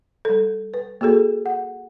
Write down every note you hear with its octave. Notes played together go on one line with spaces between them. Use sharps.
G3 A4
B4
A#3 F#4 G#4 A4
F#5